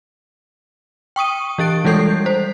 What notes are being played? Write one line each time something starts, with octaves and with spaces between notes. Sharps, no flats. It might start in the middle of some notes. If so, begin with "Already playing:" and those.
G5 C#6 D#6 D#7
E3 G4 A6 D7
E3 G3 G#3 A4 G6 C7
C5